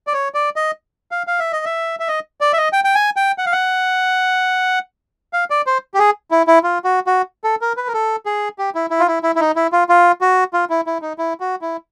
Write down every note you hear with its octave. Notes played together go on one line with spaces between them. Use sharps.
D5
C#5
D5
D#5
F5
F5
E5
D#5
E5
E5
D#5
D5
E5
D#5
G5
G5
G#5
G5
F#5
F5
F#5
F5
D5
C5
G4
G#4
E4
E4
F4
F#4
F#4
A4
A#4
B4
A#4
A4
G#4
G4
E4
E4
F4
E4
E4
E4
D#4
E4
F4
F4
F#4
F4
E4
E4
D#4
E4
F#4
E4